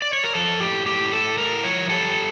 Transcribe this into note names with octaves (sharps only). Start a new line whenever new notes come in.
D5
C#5
A#4
F3 A4
A2 G4
A2 G4
A2 A4
A2 A#4
F3 C#5
G3 A4